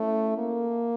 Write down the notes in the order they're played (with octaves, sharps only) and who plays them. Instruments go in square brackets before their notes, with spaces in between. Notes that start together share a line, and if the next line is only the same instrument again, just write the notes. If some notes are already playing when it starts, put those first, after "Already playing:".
Already playing: [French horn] A3 [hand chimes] C#4 E4 A4 C#5 E5
[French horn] A#3